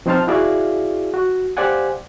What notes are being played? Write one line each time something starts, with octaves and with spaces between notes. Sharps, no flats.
F3 C4 D#4 C5 A5 F6
E4 F#4 G#4 D5 E5 F5
F#4
G4 C5 D5 F5 F#5 G#5